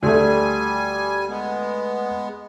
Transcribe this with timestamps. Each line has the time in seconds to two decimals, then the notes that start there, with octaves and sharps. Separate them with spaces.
0.03 D2 G3 A3 G#5
1.29 G#3 B3